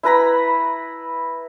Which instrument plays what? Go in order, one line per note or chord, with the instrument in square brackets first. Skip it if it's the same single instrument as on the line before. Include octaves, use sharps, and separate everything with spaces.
[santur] E4 B4 A#5 B5